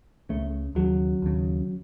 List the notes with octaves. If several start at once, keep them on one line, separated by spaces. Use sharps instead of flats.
C#2 C#3 A3
D#2 C#3 F#3
D#2 C#3